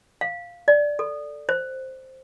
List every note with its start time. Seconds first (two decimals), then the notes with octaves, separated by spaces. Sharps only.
0.21 F5
0.68 D5
0.99 A4
1.49 C5